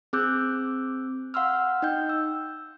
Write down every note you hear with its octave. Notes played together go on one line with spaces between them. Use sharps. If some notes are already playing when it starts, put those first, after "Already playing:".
C4 G#4 D6 E6 F#6 G6
F5 F#5 C6 E6 F6
D#4 D#5 G5 G6
E6